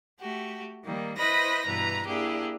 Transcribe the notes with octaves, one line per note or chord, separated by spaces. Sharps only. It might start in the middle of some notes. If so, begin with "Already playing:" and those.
A3 F#4 G4
D#3 G3 A#3
E4 B4 C5 D#5 B5 A#6
G2 B2 E3 B4 A#5
A#3 D4 E4 G4 G#4